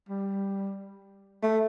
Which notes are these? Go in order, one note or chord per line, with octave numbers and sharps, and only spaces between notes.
G3
A3